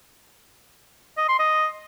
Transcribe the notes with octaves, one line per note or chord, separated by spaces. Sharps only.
D#5
C6
D#5